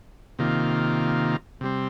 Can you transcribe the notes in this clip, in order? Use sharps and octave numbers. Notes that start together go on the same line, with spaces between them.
C3 D#3 A#3 F4
C3 G3 C4